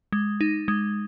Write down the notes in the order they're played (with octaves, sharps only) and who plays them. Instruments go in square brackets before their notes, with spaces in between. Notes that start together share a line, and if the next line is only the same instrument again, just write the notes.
[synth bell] G#3
D#4
G#3